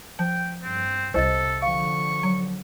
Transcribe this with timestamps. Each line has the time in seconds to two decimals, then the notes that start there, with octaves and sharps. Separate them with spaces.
0.19 F3 G5
0.63 G2 C4
1.14 C2 C3 A4 C5 D#5 A6
1.62 D3 F3 F5 C#6
2.23 F#3